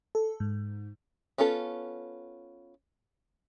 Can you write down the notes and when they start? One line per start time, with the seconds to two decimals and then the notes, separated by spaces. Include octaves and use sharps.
0.15 A4
0.40 G#2
1.38 B3 C#4 F4 A4